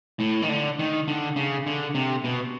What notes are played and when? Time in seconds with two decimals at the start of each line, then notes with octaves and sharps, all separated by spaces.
0.20 A2
0.42 D#3
0.49 D3
0.79 D#3
1.08 D3
1.36 C#3
1.66 D3
1.95 C3
2.24 B2